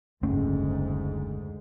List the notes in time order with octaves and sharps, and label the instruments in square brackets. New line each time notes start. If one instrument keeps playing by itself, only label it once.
[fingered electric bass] F#1 A3 C#4 [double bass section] D2 G#2